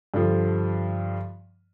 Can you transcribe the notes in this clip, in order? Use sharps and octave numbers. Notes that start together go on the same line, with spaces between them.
G2 D3 F3